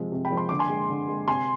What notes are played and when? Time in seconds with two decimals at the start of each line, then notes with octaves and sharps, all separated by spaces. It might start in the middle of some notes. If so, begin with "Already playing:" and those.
Already playing: C3 F3 G#3
0.12 C3
0.25 G5 B5
0.30 F3 G#3
0.37 C6
0.49 D3 D6
0.59 G#5 C6
0.69 G#3
0.90 D3
1.08 G#3
1.28 C3 G#5 C6